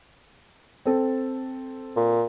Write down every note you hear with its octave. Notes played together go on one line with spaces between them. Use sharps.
C4 A4
A#2